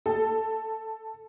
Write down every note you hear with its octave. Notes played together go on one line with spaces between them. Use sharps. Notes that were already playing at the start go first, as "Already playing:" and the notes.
A4